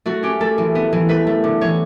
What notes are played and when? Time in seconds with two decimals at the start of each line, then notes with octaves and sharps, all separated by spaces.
0.06 A3 F#4
0.23 C#4 G4
0.40 A3 A4
0.58 E3
0.75 B3
0.93 E3
1.09 A3 B4
1.27 A3
1.44 D3
1.61 E3 C#5